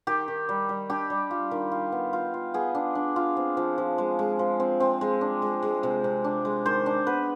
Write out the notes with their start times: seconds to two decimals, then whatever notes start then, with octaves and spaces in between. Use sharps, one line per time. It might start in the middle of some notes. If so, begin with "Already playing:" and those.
0.07 D#3 G4
0.28 D#3
0.49 G3
0.69 G3
0.90 D4 G4
1.10 G3
1.31 F4
1.51 D#3
1.72 F4
1.92 B3
2.13 F4
2.34 F4
2.54 B3 G#4
2.75 D4
2.95 D4
3.16 F4
3.37 C4
3.57 F3
3.78 F3
3.98 G#3
4.19 G#3
4.39 F3
4.60 C4
4.80 C4
5.01 G#3
5.21 D4
5.42 G#3
5.63 G#3
5.83 C3
6.04 C3
6.24 D4
6.45 G#3
6.66 D#3 C5
6.86 D4
7.07 B3 B4